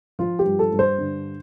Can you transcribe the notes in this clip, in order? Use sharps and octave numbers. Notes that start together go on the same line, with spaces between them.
F3 F4
G4
G2
A4
G2
C5
D3